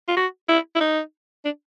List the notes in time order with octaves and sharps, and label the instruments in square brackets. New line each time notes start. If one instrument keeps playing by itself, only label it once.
[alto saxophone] F4
F#4
E4
E4
D#4
D4